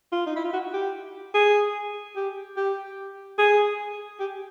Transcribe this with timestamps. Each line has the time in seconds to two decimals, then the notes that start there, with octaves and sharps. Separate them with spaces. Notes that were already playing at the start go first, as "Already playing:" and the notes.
0.12 F4
0.27 D#4
0.36 E4
0.44 F4
0.53 F#4
0.73 G4
1.34 G#4
2.16 G4
2.57 G4
3.39 G#4
4.20 G4